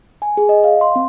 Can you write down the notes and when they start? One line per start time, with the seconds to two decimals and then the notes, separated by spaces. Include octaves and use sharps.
0.22 G#5
0.37 G#4
0.49 D#5
0.64 F5
0.81 C6
0.96 C4